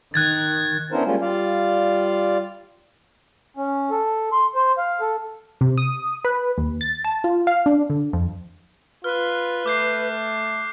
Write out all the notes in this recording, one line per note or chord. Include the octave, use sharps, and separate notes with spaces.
D#3 F#6 G#6 A6
B3 C#4 D4 E4 A#4 C5
G3 G#3 A#3 C#4 F4
G3 F4 D5 F5
C#4
A4
C6
C5
F5
A4
C3
D#6
B4
D#2
A6
A5
F4
F5
D4
D3
F2
F4 B4 F6 F#6
A3 D6 G6 C7